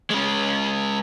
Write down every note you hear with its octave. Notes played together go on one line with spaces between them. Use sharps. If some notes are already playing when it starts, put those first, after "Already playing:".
G#3 C#4